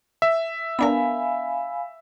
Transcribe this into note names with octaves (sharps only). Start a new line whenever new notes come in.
E5
B3 D4 A#4 F5 G#5 B5